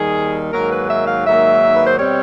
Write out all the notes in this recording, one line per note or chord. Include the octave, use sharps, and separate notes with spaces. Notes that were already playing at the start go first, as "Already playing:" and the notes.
Already playing: D#2 D#3 G3 G#4
G#2 D#3 F#3 A#3 A#4
B4
E5
F5
G#2 D#3 F#3 A#3 E5
B4
C5
B2 G3 C4 C#5